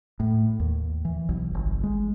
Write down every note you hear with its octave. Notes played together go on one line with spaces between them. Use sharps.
A2
D#2
E3
B1
G1
G#3